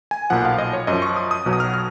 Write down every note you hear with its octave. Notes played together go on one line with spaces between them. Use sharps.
G#5
B1 A#2 F3 F#5
F5
D#5
C#5
F#2 F3 D#5
C#6
D#6
D#6
B1 B2 F#3
D#6
F6
F6